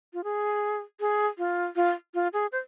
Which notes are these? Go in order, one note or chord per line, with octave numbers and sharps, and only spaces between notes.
F4
G#4
G#4
F4
F4
F4
G#4
C5